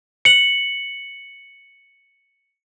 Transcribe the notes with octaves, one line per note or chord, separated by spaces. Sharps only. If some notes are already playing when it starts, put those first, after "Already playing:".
C#7 F#7